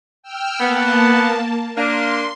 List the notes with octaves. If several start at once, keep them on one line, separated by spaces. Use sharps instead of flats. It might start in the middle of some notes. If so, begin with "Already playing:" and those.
G5 E6 F6
A#3 B3 A5
A#3 D4 C6